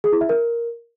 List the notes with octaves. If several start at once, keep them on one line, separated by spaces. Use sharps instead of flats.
G#4
E4
E5
A#4